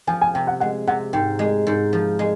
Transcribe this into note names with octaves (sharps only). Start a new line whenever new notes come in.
F3 G#5
G#5
C3 G5
F#5
G#3 F#5
C3 F#5
G#2 G5
G#3
G#2
F3
G#3